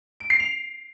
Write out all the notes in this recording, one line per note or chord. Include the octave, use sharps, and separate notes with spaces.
D7
C7
F7